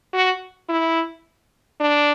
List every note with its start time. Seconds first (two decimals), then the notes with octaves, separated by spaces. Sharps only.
0.14 F#4
0.69 E4
1.80 D4